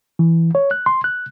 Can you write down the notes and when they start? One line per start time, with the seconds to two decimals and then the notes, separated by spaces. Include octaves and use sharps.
0.19 E3
0.55 C#5
0.71 F#6
0.86 C6
1.04 F#6